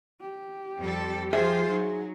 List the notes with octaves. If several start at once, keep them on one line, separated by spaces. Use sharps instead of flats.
G4
F2 G3 A4
F3 F4 G#4 C5 E5
F#3 D#4 F#4